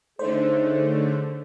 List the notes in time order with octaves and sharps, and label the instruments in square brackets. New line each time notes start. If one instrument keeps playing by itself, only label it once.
[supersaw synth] D3 A3 [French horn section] D#4 G#4 C#5 [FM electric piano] C5